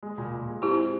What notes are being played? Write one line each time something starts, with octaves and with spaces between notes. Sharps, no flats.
G#3
A#2
A#2
G#3
C4 E4 G4
G#3